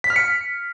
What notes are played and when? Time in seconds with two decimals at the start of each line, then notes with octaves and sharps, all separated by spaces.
0.04 B6
0.10 F6
0.16 C#7